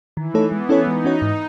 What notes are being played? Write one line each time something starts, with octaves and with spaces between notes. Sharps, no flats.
D#3 E3
A3 D#4 A4 C#5
G#3 B3
C#4 E4 A4 C#5
G#3 D#4
C#4 F#4 C#5
G#2